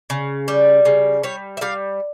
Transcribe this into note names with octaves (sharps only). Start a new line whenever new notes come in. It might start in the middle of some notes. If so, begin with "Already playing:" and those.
C#3
G3
C#3
G3 C#5
E5
G3 F5